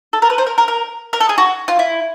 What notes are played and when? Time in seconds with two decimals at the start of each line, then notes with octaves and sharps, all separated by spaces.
0.13 A4
0.22 A#4
0.30 B4
0.38 C5
0.46 A#4
0.58 A#4
0.68 A#4
1.13 A#4
1.20 A4
1.29 G#4
1.38 F#4
1.68 F4
1.79 E4